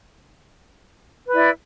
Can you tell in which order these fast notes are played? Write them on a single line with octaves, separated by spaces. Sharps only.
B4 E4 D5